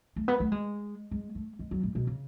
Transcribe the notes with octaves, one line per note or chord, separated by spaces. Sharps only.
A3
B3
A3
G#3
G#3
A3
G#3
F#3
A2
B2
C#3